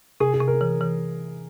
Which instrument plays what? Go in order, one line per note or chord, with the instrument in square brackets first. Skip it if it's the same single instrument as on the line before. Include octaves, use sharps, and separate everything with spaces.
[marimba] C3 [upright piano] G#4
[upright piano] G#4
[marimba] C3
[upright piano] A#4
[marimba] E3
E3